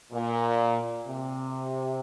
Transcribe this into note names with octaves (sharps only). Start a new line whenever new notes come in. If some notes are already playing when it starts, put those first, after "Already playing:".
A#2
C3